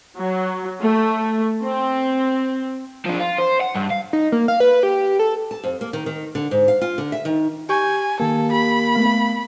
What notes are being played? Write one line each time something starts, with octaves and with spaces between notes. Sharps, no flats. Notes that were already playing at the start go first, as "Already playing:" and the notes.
F#3
A3
C4
F3 D4
F4
C5
F#5
G2
F5
D#4
A#3
F5
B4
G4
A4
A5
F2
A#3
D#3
D#3
D3
G#2
F5
F4
D3
E5
D#3
G4 G#5 C#6 G6
D#3 A#3 G4 A4
G4 B5
A3 B3 F5